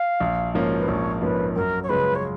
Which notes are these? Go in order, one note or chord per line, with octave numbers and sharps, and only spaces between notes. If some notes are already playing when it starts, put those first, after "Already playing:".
Already playing: F5
A#1
G#2 F3 A#3 C#4
B4
A#1 C#5
G#2 F3 A#3 C#4 B4
F#2 A#4
C#5
C#3 F3 G#3 B4
C#5